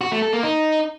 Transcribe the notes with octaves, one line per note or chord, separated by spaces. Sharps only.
F#4
A3
A4
A#3
D#4